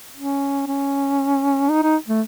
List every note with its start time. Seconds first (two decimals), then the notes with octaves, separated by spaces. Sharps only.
0.16 C#4
0.67 C#4
1.70 D#4
1.83 D#4
2.08 A3